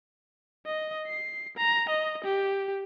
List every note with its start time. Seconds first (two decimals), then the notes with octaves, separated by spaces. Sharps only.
0.66 D#5
1.07 C7
1.57 A#5
1.89 D#5
2.24 G4